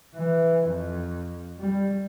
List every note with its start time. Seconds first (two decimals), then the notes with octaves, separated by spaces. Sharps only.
0.15 E3
0.68 F2
1.59 G3